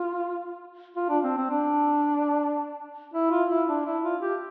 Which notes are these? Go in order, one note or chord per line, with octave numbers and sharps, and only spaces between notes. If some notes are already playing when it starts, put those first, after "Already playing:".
Already playing: F4
F4
D4
C4
C4
D4
E4
F4
E4
D4
E4
F4
G4